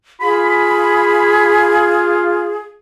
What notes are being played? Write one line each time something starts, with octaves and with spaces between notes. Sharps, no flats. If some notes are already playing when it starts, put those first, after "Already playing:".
F4 G#4 B5